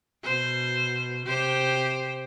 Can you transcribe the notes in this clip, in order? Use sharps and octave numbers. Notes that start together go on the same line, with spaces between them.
B2 C5
C3 G4 C5